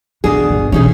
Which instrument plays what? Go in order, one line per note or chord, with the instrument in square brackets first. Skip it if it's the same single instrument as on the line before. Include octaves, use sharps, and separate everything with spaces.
[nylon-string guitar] B2 D4 G#4 [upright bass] E3
[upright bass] G1 G3
[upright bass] B2 E3 [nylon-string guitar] C#4 D#4 G#4